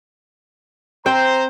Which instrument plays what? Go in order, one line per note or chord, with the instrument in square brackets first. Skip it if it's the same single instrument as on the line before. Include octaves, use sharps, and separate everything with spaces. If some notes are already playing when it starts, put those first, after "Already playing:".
[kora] C4 G5 [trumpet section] C5 A#5